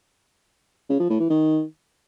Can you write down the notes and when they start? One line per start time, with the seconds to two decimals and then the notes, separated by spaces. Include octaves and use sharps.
0.90 C#3
1.00 F3
1.10 A2
1.20 E3
1.30 D#3